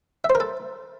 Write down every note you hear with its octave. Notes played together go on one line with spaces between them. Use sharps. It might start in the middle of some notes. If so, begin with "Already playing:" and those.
E5
C5
A#4
A4